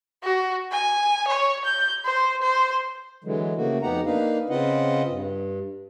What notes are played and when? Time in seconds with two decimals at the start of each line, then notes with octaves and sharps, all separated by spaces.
0.23 F#4
0.71 G#5
1.27 C#5
1.65 G6
2.05 C5
2.42 C5
3.24 D3 E3 F#3 G#3
3.56 C#3 A3 A#3 F#4
3.82 F2 B3 D#4 G4 F#5 A#5
4.06 A#3 D4 D#4 B4 F5
4.50 C#3 C4 F4 B4 D#5 F#5
5.08 G2